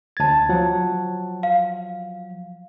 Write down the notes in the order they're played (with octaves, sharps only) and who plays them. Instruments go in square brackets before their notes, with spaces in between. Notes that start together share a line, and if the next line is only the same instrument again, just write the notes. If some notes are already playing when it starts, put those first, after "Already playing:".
[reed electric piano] D2 A6 [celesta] A5 G#6
[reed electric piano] F3 F#3 F#5
[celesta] F5